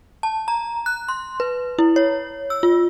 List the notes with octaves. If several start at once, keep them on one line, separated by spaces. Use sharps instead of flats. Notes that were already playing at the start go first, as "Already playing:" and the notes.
A5
A#5
F#6
C6
B4
E4
C#5
E6
F4